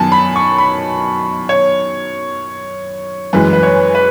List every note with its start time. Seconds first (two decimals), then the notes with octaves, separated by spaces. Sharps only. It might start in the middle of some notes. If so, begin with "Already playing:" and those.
Already playing: F#2 D#3 F#3 B3 G#5 A5
0.12 B5
0.36 C#6
0.58 B5
1.49 C#5
3.33 F#2 E3 G#3 B4
3.53 B4
3.63 C#5
3.95 B4